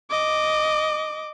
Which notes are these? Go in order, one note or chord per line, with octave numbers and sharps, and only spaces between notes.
D#5 D6